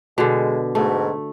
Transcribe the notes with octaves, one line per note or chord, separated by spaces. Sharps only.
B2 D3 G#3
G#2 B2 A3